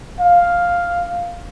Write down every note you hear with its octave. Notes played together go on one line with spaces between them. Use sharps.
F5